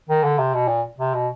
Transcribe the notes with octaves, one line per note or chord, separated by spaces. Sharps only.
D#3
D3
C3
B2
A#2
C3
B2